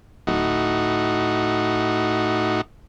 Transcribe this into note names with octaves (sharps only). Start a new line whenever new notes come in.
D1 A2 D#4 F#4